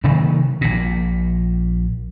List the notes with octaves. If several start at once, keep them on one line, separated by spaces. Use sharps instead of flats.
C3 D#3 F#3 A#3
A#1 A#2